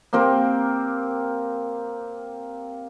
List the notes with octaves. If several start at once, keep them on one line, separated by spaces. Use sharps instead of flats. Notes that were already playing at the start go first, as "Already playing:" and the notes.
A#3 C4 G4 A#4